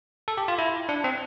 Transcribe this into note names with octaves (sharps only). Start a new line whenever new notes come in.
A4
G4
F4
E4
D4
C4